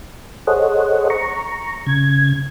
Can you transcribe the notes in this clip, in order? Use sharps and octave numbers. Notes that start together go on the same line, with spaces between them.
G#4 A4 C5 C#5 D#5 F#5
A#5 C#6
C#3 G#6